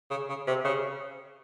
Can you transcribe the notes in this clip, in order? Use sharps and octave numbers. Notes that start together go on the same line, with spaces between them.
C#3
C#3
C3
C#3